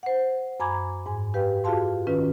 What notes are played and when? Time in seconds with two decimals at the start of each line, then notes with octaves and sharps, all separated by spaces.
0.03 C5 F#5
0.60 F#2 G#5 A#5 B5 D6 G#6
1.06 G#2 G#5
1.34 G4 B4 F5 G5
1.64 F4 F#4 G#4 F5 A5 C6
2.07 D#3 C#4 F4 B4